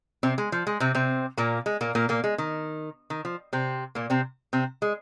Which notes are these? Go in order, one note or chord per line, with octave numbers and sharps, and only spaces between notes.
C3 C4
G#3
F3
G#3
C3 C4
C3 C4
A#2 A#3
G#3
A#2 A#3
A#2 A#3
A#2 A#3
G#3
D#3
D#3
F3
C3 C4
A#2 A#3
C3 C4
C3 C4
G#3